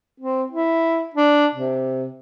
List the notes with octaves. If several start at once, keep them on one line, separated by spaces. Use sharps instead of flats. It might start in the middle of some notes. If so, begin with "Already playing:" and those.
C4
E4
D4
C3